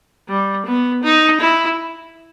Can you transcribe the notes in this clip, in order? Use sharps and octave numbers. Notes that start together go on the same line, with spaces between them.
G3
B3
D#4
E4